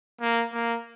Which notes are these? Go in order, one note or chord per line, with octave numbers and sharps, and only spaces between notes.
A#3
A#3